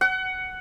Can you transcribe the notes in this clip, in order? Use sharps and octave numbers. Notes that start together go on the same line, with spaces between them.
F#5